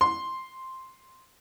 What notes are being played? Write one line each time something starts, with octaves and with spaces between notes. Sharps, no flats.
C6